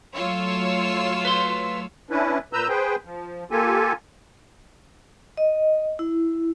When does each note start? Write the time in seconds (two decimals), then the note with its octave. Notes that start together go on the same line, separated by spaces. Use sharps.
0.15 F#3 A3 F4 C#5 E6
1.25 B4 C6
2.10 C#4 D4 E4 B4
2.53 A#2 B4 A#5 E6 G6
2.69 G#4 B4 C5 G5
3.05 F3
3.51 A#3 F4 G4 A4 G#5
5.37 D#5
5.99 E4